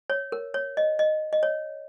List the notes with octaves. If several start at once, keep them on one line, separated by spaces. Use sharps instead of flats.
C#5
A#4
C#5
D#5
D#5
D#5
C#5